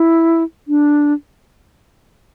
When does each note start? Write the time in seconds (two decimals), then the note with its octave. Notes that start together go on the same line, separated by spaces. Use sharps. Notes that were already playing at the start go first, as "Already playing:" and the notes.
Already playing: E4
0.68 D4